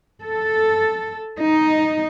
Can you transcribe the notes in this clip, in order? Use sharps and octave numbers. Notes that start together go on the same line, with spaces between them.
A4
D#4